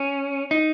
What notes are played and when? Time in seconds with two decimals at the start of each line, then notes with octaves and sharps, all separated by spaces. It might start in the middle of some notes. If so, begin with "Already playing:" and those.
Already playing: C#4
0.51 D#4